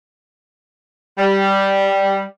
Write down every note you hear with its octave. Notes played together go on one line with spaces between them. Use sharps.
G3